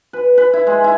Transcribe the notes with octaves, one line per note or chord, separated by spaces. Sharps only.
B4
B4
E4
G#3
E4